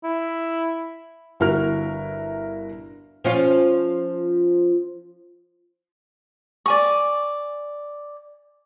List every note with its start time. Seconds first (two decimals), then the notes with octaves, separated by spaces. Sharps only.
0.04 E4
1.40 G1 E4 F#4 A#4 F6
3.24 F3 C#4 F4
6.66 D5 G#5 C#6